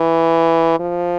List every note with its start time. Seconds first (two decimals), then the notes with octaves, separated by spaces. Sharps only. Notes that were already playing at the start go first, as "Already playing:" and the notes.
Already playing: E3
0.79 F3